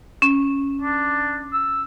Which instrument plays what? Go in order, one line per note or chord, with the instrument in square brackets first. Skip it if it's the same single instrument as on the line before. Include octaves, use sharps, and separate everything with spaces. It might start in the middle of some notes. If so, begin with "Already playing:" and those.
[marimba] C#4
[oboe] D4
E6